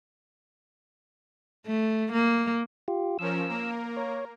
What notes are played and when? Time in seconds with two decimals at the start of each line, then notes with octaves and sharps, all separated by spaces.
1.66 A3
2.12 A#3
2.88 F4 G4
3.19 F3 C#4 A#4 E6
3.49 A#3 A#4
3.97 C#5